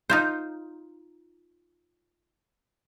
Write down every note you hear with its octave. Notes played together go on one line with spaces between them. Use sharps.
D#4 F4 C5